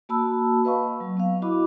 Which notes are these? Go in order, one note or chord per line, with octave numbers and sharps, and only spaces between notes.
A#3 F#4 A5 B5 E6
B4 D#5 F5 A5 C#6
F#3
B3 F5
E4 F#4 D#5 B5 D6